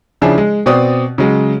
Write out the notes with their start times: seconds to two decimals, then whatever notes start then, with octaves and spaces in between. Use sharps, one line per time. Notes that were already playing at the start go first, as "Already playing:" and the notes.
0.22 C#3 F3 D4 E4 G#4
0.38 G#3
0.66 B2 C4 D5 D#6
1.18 C#3 F#3 G#3